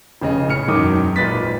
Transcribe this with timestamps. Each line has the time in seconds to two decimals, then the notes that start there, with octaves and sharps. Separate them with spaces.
0.21 F1 C#3 D#5
0.49 A2 F6 C#7
0.68 E1 F#2 D#3 A#4 D6 D#6
1.16 G#1 A#2 B4 A6 B6